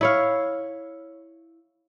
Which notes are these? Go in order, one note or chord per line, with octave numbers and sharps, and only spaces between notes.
E4 C#5 F5